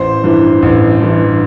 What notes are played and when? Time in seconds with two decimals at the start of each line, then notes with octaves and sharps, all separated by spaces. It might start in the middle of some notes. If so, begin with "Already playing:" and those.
Already playing: A1 C5
0.24 G2 E3
0.62 A1
1.01 G2 E3